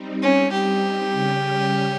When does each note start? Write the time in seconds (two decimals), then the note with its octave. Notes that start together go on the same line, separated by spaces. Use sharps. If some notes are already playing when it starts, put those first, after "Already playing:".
Already playing: G3 C4 D#4
0.23 C#4
0.52 G4
1.13 C#3 G3 C#4